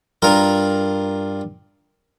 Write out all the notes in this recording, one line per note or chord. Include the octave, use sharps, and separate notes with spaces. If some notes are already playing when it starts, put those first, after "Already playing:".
G2 F4 A#4